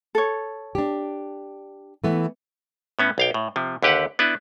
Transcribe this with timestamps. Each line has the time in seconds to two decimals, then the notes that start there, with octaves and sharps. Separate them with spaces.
0.15 A4 C#5
0.75 D4 G4
2.04 E3 A3 B3
2.99 A2 B3 C#4
3.18 B1 F5 G5
3.34 A2
3.56 C3 F3
3.83 D#2 D3 G4 B4 F#5
4.19 B3 D4 E4 B4